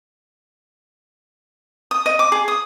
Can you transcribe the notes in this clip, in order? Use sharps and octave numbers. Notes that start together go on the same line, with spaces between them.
D#6
D#5
D6
G#4
D#6